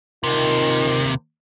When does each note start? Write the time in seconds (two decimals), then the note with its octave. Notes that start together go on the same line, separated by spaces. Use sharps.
0.24 D#2 C3 D#4 F4 A#4